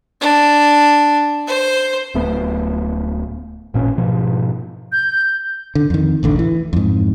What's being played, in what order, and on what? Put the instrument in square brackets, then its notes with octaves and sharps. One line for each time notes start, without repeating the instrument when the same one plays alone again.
[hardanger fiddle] D4
C5
[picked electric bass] D1 A3 B3
A1 A#2 C#4
G#2 B2 F3
[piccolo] G6
[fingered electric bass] D3
F2 D#3
E1 A1 D3
E3
F2 G#2